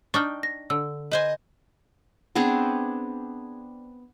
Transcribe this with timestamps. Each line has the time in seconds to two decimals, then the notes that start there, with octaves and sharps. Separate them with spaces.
0.14 D4 D#4 G5 C#6 F6
0.43 A#6
0.70 D3 E6
1.11 B4 C5 D#5 G#5
2.35 B3 C4 D4 G#4